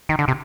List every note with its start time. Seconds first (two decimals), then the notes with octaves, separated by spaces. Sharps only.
0.09 D#3
0.19 D3
0.28 C3